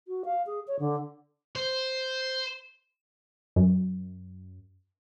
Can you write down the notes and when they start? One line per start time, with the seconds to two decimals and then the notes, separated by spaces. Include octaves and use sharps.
0.08 F#4
0.25 F5
0.46 G#4
0.67 C#5
0.79 D3
1.56 C5
3.56 F#2